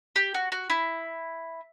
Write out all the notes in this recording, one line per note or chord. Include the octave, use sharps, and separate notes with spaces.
G4
F#4
F#4
E4